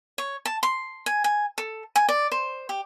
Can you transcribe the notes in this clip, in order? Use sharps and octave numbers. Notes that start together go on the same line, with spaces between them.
C#5
A5
C6
G#5
G#5
A4
G#5
D5
C5
G4